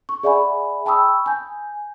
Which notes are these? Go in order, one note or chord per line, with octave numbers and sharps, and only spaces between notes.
C#6
G#4 D5 E5 F#5 G#5 B5
G5 A5 B5 C#6 D#6 E6
G#5 G6